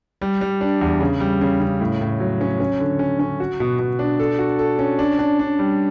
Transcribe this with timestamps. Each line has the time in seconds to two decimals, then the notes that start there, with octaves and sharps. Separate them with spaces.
0.21 G3
0.41 G3
0.61 D4
0.81 E2
1.00 C#3
1.20 G3
1.41 C#3
1.60 C#3
1.80 A2
2.01 A2
2.20 F#3
2.41 C#4
2.60 C#4
2.80 D3
2.99 C#4
3.19 C#4
3.40 F#4
3.60 B2
3.79 B2
3.99 D4
4.19 A4
4.39 F#4
4.59 A4
4.79 C#4
4.99 D4
5.19 D4
5.39 D4
5.59 G3